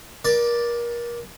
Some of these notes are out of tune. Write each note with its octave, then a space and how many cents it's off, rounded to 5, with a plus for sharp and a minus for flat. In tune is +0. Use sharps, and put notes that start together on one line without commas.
A#4 +30 D5 +0